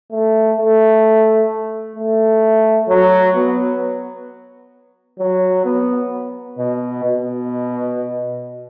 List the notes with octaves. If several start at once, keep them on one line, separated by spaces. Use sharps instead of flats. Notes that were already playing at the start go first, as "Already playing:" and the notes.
A3
A3
A3
F#3
B3
F#3
B3
B2
B2